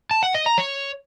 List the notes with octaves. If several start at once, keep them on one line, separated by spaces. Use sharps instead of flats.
A5
F#5
D#5
A#5
C#5